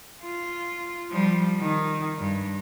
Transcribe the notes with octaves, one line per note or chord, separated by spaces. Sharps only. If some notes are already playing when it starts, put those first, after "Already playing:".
F4
F3 G3
D#3
G2